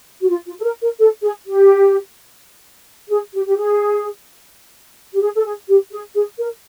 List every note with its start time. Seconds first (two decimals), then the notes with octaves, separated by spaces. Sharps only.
0.21 F#4
0.28 F4
0.46 F4
0.59 A4
0.63 A#4
0.80 A#4
0.98 A4
1.21 G#4
1.45 G4
3.09 G#4
3.33 G4
3.45 G4
3.56 G#4
5.12 G4
5.20 G#4
5.34 A4
5.43 G#4
5.67 G4
5.91 G#4
6.14 G#4
6.38 A#4